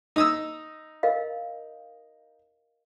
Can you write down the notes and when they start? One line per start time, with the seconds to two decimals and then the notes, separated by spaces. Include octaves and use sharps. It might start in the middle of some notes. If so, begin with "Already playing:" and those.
0.16 D#4 D#6 E6
1.03 A#4 D#5 F5